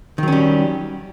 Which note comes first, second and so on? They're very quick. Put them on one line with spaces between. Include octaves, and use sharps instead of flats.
D#3 F#3 C#4 G3